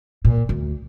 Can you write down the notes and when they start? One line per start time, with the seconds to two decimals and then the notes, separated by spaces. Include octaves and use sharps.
0.25 A#2
0.49 D2